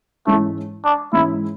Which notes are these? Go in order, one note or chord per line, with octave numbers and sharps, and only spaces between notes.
G#2 E3 G#3 A3 C#4
D4
G#2 E3 G#3 C#4 E4